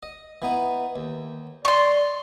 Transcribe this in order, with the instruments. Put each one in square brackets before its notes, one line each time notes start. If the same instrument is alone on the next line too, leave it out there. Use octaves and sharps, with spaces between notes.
[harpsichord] D#5
E3 B3 D#4
D#2
[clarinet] D5 [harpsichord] D#5 [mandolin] C6 C#6